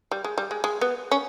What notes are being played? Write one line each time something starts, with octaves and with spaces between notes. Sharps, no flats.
G3
G#3
G3
G#3
G#3
B3
C#4